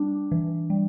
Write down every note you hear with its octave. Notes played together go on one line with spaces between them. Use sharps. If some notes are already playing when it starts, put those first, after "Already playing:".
Already playing: G3 D4
E3
G3